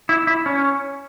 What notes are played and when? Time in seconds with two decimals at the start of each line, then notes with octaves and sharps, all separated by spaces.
0.09 E4
0.27 E4
0.46 C#4